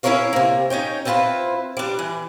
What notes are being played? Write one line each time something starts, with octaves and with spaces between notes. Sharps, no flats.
C#4 E4 A4 A#4 C#5 F5
C3 A#3
C#4 D#4 C#5 G5
C4 E4 F4 G4 B4 C5
G3 D4
E3